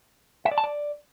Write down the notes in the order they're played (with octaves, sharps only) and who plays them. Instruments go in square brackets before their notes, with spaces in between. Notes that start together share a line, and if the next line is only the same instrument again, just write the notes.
[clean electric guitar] E5
D5
A5
D5